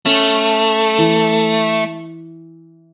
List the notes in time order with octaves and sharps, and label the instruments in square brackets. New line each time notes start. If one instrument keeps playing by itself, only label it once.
[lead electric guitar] A3 [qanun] C#4
[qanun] E3